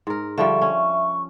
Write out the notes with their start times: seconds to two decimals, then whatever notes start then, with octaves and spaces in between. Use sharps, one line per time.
0.07 G#2 A#4
0.38 D3 F3 G3 E5 C#6
0.62 C#4